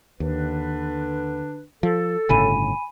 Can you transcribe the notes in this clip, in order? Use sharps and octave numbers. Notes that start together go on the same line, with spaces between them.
D#2 D3 D4 B4
F3 A4
G1 A2 C#3 G#5 B5 D#7